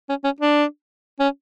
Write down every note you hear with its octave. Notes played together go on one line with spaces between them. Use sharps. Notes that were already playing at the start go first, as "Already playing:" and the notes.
C#4
C#4
D4
C#4